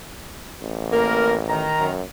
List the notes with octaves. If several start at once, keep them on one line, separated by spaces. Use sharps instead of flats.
A1
A#3 A#4
D#3 A#5
F#2